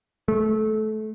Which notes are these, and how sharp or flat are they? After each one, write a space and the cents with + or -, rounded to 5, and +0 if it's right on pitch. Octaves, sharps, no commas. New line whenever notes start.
A3 -25